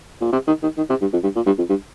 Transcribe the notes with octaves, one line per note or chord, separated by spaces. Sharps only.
A#2
C3
D#3
D#3
D#3
C3
G2
F2
G2
A#2
G2
F2
G2